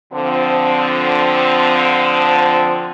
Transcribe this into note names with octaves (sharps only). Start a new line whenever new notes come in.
D3 F3 C4